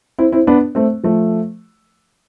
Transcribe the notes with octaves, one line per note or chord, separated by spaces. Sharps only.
C4 E4
C4 E4
B3 D4
A3 C4
F3 A3